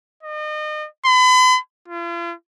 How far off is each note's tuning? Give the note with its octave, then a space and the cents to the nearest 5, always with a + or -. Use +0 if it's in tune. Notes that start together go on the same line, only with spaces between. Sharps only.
D#5 -35
B5 +40
F4 -40